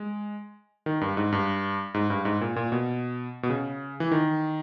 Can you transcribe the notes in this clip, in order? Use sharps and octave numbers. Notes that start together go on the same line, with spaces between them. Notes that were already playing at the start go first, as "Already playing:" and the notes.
Already playing: G#3
D#3
G2
G#2
G2
G#2
G2
G#2
A#2
A#2
B2
B2
C#3
E3
D#3